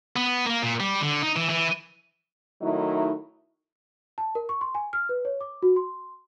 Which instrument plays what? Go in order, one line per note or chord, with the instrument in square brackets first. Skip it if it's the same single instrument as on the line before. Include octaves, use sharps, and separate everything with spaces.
[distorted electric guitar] B3
A#3
A#2
G3
D3
D#4
E3
E3
[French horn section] D#3 F#3 A3 D#4 E4
[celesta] A5
A#4
C#6
C6
G#5
F6
B4
C#5
D6
F#4
C6